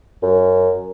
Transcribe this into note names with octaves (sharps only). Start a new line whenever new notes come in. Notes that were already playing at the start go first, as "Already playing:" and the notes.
F#2